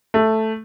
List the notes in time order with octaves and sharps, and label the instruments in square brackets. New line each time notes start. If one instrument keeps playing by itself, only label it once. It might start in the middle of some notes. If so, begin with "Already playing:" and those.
[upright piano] A3